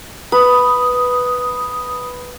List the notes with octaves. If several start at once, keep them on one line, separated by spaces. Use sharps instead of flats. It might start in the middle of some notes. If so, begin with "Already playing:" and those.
B4 D#6